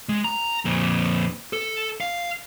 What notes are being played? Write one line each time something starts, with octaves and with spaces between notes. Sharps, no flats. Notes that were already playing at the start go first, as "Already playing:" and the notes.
G#3
A#5
F2 A#2
A4
F5